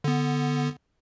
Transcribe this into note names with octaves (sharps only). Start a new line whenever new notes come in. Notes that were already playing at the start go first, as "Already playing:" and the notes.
D3 B3